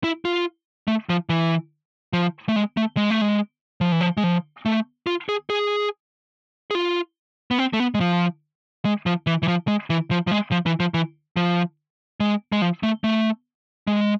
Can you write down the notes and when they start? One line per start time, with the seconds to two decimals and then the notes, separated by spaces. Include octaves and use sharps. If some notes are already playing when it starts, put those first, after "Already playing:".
0.04 E4
0.25 F4
0.88 A3
1.09 F3
1.29 E3
2.13 F3
2.49 A3
2.56 G#3
2.77 A3
2.97 G#3
3.10 A3
3.21 G#3
3.81 F3
3.92 E3
4.01 F3
4.17 G#3
4.24 F3
4.66 A3
5.07 F4
5.29 G#4
5.50 G#4
6.71 G#4
6.75 F4
7.51 B3
7.58 C4
7.73 A3
7.80 B3
7.95 G#3
8.00 F3
8.85 G#3
9.06 F3
9.27 E3
9.43 E3
9.48 F3
9.68 G#3
9.90 E3
10.11 F3
10.27 F3
10.31 G#3
10.52 F3
10.66 E3
10.80 F3
10.94 E3
11.36 F3
12.20 G#3
12.52 G#3
12.62 F3
12.83 A3
13.04 A3
13.87 G#3